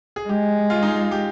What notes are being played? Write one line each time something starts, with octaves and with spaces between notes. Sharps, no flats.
G#4
G#3 G4
F4
D#4
F4
G4